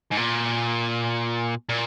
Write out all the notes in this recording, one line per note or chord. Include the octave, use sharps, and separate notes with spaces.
G#2
A#2
A#2